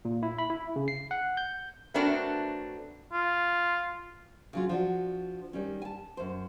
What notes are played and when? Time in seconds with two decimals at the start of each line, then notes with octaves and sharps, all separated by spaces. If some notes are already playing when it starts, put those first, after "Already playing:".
0.05 A#2
0.23 E4
0.38 B5
0.50 E4
0.76 C#3
0.88 C7
1.11 F#5
1.37 G6
1.94 A3 B3 C4 D4 F#4 A#4
3.13 F4
4.53 C#3 F#3 F4
4.69 F3 D4 F#4
5.53 D#3 G3 C#4
5.82 G#5 A5
6.17 F#2 C5